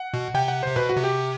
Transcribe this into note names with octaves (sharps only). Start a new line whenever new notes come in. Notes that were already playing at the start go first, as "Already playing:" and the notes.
Already playing: F#5
B2
C3 G5
F#5
C3 C5
B2 B4
F#4
C3
G4